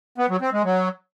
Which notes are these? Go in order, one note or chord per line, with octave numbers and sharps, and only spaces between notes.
B3
F#3
C4
G#3
F#3